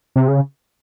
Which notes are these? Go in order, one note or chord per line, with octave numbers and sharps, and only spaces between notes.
C3
C#3